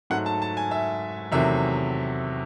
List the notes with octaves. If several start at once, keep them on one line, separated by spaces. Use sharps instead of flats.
G#2 F#3 A3 F#5
A5
A5
G#5
E5
E2 C3 D#3 F#3 A3 E5